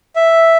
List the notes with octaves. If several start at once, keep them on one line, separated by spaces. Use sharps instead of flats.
E5